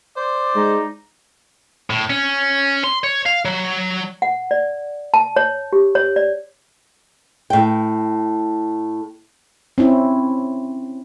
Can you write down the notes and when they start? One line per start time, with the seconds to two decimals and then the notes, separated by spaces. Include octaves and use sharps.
0.17 C5 D5
0.55 G#3 D#4
1.90 A2
2.10 C#4
2.84 C6
3.04 C#5
3.26 F5
3.45 F#3
4.22 F#5
4.51 D5
5.14 A5
5.36 C#5
5.73 G4
5.95 C#5
6.16 D5
7.50 A2 G5
9.78 C4 C#4 E4